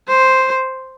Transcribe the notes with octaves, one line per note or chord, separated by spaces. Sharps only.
C5